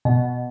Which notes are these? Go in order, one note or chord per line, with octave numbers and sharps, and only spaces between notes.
B2